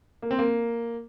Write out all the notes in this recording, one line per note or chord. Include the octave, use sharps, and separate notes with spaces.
A#3
C4
A#3